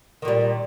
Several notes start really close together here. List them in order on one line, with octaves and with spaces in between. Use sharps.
D#3 A#2 G3